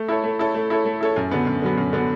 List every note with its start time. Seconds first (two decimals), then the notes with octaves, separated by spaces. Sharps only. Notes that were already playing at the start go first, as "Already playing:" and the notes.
Already playing: A3
0.08 E4 A4 C#5
0.24 A3
0.39 E4 A4 C#5
0.54 A3
0.70 E4 A4 C#5
0.85 A3
1.01 E4 A4 C#5
1.16 F#2
1.31 D3 F#3 B3
1.47 F#2
1.62 D3 F#3 B3
1.78 F#2
1.93 D3 F#3 B3